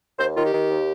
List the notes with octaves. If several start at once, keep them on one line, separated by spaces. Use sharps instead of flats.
D#2 C5
D#3 F4
G4
D#3
D#2